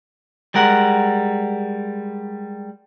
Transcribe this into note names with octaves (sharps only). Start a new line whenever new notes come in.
G3 G#3 A#4 F#5